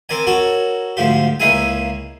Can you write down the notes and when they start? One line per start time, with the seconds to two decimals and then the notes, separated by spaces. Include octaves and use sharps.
0.09 C4 A#4 D5 G#5
0.27 F#4 A4 A#4 C#5
0.97 D2 G#2 F3 G4
1.40 C#2 A#3 D#4 E4 G#4 G#5